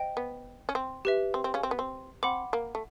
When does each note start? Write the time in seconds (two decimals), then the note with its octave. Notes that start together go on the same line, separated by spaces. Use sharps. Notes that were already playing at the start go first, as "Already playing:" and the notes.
Already playing: C5 D#5 G5
0.17 B3
0.69 C#4
0.75 C4
1.05 G4 B4 E5
1.34 C4
1.44 C4
1.54 C#3 C#4
1.63 C4
1.71 B3
1.79 C4
2.23 C4 F#5 B5 D6
2.53 A#3
2.75 A3